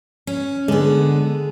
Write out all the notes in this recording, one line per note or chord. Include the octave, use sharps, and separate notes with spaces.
C#4
D3 G#3 B3 G#4